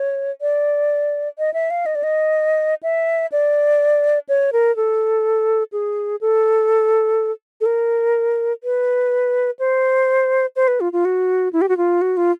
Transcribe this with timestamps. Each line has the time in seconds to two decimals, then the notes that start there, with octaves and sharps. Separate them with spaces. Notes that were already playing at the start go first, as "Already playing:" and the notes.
Already playing: C#5
0.41 D5
1.39 D#5
1.54 E5
1.70 F5
1.86 D#5
1.95 D5
2.03 D#5
2.83 E5
3.32 D5
4.29 C#5
4.53 A#4
4.76 A4
5.73 G#4
6.21 A4
7.61 A4
7.66 A#4
8.64 B4
9.59 C5
10.56 C5
10.68 B4
10.81 F4
10.93 F4
11.05 F#4
11.53 E4
11.61 G4
11.69 F#4
11.77 F4
12.01 F#4
12.17 F4